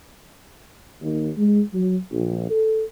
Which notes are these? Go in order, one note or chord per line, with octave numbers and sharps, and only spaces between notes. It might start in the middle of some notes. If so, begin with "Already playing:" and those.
D#2
G#3
F#3
A#1
A4